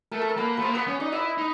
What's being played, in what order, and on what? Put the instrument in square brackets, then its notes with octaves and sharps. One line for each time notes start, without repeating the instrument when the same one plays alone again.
[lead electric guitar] A3 [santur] A#4
[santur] A4
A#4
[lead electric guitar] A#3 [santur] B4
[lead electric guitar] A3 [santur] B4
[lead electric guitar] A#3 [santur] C5
[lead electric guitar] B3 [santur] B4
[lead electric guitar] C#4
[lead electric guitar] D#4 [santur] D5
[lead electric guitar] E4 [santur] D#5
[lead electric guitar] D#4